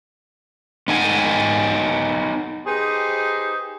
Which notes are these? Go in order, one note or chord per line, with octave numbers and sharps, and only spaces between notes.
B3 D#4 G#5
D#4 G4 G#4 B4 C5